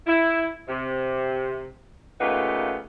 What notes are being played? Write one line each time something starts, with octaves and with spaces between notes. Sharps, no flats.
E4
C3
A#2 C#3 A3 B3 D#4 G4